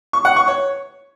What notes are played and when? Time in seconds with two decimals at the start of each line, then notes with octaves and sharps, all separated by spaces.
0.13 C#6
0.25 F#5
0.36 C#6
0.48 C#5